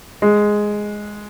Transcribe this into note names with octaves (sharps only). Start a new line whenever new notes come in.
G#3